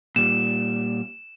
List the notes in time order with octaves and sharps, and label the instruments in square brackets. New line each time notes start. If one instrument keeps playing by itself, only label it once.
[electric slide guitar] A#2 G3 [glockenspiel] E7